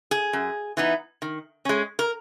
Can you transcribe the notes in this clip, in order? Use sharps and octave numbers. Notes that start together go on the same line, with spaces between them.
G#4
F#2
E3 B3 D#4
D#3
G#3 C#4
A#4